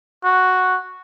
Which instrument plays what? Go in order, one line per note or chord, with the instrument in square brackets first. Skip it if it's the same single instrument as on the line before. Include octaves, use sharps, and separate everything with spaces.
[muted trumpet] F#4